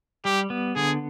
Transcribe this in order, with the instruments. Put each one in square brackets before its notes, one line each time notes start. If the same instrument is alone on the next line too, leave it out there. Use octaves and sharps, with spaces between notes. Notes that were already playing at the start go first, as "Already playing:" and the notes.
[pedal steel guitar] G3 [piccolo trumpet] G4
[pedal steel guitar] B3
[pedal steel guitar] D3 [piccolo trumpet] G#4